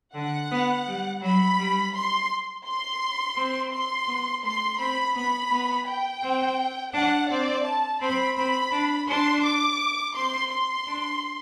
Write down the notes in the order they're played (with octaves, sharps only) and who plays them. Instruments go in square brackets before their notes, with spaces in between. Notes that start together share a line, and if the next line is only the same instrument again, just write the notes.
[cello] D3 [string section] F#5
[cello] B3
G3
[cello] F#3 [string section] B5
[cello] G3
[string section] C6
C6
[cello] C4
[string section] C6
[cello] B3
[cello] A3 [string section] C6
[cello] C4 [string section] B5
[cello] B3 [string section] B5
[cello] B3
[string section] G5
[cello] C4
[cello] D4 [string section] F#5
[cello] C4 [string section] D5
[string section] A5
[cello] C4 [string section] B5
[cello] C4 [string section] B5
[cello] D4
[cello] D4 [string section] C6
[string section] D6
[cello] C4 [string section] C6
[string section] C6
[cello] D4